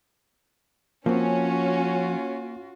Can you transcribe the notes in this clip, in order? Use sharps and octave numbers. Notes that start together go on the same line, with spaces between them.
F3 A#3 C4 C#4 F4 F#4